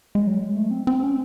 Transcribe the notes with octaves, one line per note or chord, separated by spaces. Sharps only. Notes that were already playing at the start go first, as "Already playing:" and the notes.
G#3
F#3
G#3
A3
C4
C4
C#4